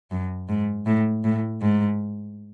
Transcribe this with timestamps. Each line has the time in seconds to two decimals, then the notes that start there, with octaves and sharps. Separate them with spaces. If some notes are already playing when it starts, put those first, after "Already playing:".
0.11 F#2
0.49 G#2
0.86 A2
1.24 A2
1.61 G#2